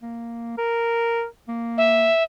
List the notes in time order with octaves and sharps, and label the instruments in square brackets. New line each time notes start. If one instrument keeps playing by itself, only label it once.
[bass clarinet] A#3
A#4
A#3
[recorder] E5